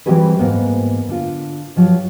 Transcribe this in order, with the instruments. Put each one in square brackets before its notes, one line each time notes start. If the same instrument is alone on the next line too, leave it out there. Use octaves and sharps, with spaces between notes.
[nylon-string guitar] E3 G3 C4 F#4 G#4 B4
G#2 A#3 B3
D3 F4
G2 F3 F#3